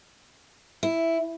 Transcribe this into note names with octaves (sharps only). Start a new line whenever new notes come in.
E4